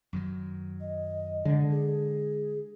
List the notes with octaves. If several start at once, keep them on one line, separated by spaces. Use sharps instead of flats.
F#2 D#3 F#3
D#5
D3 G#3
G#4